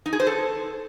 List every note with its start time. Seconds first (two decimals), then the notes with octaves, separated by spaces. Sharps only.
0.06 D#4
0.13 G#4
0.20 C5
0.27 A4